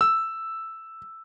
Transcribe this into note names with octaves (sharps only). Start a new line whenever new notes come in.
E6